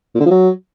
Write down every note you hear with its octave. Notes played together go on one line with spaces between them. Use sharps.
A#2
D3
F3
F#3